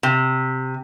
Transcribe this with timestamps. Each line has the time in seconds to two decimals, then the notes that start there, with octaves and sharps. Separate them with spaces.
0.03 C3